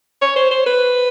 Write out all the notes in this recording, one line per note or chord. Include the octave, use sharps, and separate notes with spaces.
C#5
C5
C5
B4